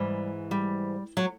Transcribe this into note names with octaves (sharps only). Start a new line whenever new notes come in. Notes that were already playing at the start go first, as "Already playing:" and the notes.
Already playing: G#2 E3 G3
G3
F#3